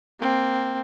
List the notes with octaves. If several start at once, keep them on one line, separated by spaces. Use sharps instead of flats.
A#3 C4